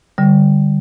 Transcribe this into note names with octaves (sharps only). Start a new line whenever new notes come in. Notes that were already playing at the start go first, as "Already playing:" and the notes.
D3 G3